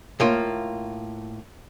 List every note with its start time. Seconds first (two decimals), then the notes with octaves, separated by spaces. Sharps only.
0.20 A2 A#3 F4